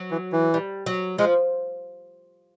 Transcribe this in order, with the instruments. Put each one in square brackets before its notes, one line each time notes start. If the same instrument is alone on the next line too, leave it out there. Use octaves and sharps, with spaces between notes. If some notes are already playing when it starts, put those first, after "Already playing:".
Already playing: [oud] F#3
[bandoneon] E3
E3
[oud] G3
F#3
[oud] F3 [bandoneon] G#3